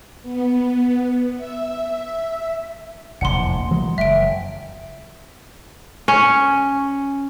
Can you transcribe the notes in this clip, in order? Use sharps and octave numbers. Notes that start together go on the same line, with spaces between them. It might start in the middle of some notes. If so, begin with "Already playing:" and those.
B3
E5
F1 A#1 E2 F#5 C6
E3 F#3 G#3
F#1 E5 D7
C#4